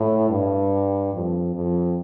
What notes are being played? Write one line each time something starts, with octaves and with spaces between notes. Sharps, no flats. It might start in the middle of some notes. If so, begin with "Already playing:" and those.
Already playing: A2
G2
F2
F2